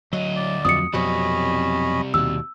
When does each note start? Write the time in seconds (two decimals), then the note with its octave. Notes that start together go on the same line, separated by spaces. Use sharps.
0.13 D2 F#3 D#5
0.36 D5
0.65 F2 F3 F#3 D#6 C#7
0.93 F2 B2 F#3 G3 C4 C#4 D#5 B5
2.14 D#2 B2 E6